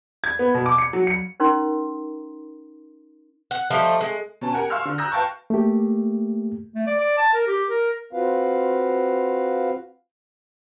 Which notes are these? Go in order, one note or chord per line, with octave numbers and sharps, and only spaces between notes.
G#6
B3
B2
D6
C#7
F#3
C#7
C#4 D#4 A#4 A#5 C6
F#5
F3 G3 A3 D#5
G#3
B2 C#4 A5
G4 A#4 F#5 G#5
F5 C6 C#6 E6 F6
D3
A#5 D#6 E6 F#6 G6 A#6
B4 F5 G5 A5 C#6
A3 A#3 G4
A3
D5
D5
A5
A#4
G4
A#4
C4 F4 F#4 B4 F5